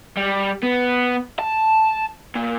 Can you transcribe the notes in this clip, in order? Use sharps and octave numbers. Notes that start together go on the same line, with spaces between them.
G3
B3
A5
A#2